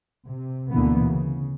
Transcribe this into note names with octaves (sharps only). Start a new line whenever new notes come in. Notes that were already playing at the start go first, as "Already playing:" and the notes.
C3
D2 B2 D3 E3 A#3 B3
C#3